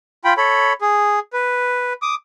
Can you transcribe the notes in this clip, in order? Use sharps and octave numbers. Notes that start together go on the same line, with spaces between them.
F4 G5 B5
A4 C#5 B5
G#4
B4
D6 D#6